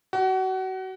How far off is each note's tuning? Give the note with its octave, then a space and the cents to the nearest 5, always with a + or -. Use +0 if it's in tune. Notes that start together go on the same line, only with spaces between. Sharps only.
F#4 +30